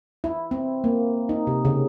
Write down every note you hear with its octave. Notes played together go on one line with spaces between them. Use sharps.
E4
C4
A#3
D#4
C3
C#3